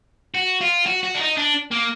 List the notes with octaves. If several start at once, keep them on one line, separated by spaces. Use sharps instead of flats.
F#4
F4
F#4
F#4
D4
D#4
D4
A#3